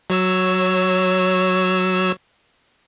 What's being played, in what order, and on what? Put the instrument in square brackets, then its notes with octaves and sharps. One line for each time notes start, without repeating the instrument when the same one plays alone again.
[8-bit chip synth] F#3 C#5 E6